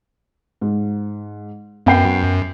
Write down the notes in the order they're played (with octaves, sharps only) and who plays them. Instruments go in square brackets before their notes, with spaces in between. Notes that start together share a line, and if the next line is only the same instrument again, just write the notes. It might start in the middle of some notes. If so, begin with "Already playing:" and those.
[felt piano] G#2
[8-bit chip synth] F#2 [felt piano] B3 G5 C7